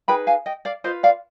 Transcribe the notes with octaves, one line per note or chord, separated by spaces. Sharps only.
D#4 G#4 B4 G5 B5
F5 G#5
D#5 G5
D5 F5
F4 B4 C5 D#5
D5 F5